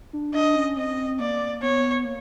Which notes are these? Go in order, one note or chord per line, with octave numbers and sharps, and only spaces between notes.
D4
D4 D#5
C#4
C4 D#5
A#3 D5
B3 C#5
A#3